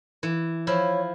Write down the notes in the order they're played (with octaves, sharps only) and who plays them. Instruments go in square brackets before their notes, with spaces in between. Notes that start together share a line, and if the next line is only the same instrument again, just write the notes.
[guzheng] E3
[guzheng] F3 E4 [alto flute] C#5